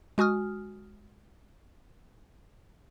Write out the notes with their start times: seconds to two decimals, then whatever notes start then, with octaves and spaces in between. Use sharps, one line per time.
0.18 G#3 F#4 G#5 D#6 F6